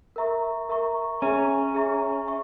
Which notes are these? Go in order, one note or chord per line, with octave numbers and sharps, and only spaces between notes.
A#4 E5 A#5 C#6
A#4 E5 A#5 C#6
C#4 G#4 E5 A#5 C#6
G#4 E5 A#5 C#6
E5 C#6